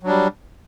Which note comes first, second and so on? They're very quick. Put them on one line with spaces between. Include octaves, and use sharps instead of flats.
F#3 D4 G3